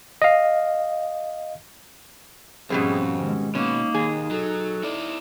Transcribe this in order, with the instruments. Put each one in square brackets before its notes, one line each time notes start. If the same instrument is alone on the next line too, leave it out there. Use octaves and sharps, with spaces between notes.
[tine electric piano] D#5 F5
[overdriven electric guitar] F2 [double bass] G#2 C#4 [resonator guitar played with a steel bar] B2 G3 C4 [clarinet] G#4
[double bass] D#3 G#3 [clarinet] C#4
[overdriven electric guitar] B2 [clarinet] A#3 [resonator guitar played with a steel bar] C#4 [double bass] D#4
[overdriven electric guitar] D#2 [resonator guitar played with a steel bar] G#4
[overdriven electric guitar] F#3 [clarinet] A4
[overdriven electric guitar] E4 D5